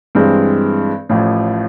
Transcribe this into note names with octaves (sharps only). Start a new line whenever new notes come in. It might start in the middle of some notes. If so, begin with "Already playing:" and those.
G2 E3 G#3 C4
A1 A2 F3